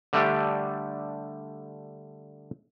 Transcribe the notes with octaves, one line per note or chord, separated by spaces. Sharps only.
D3 G3 A3 D4 G4